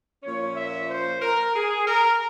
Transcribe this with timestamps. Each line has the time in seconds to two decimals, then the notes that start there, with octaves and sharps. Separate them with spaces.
0.23 A#2 F3 A#3 C#4 C#5
0.56 E5
0.89 C5
1.22 A#4
1.55 G#4
1.87 A#4